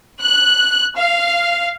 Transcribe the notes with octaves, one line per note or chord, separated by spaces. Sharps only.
F#6
F5